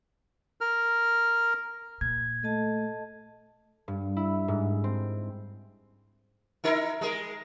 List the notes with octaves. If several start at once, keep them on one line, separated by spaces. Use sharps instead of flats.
A#4 F6
A#2 G#6
A3 A4 D#5 A5
G2
E4
G#2
C4
D#4 E4 A#4
G#3 G#4 A#4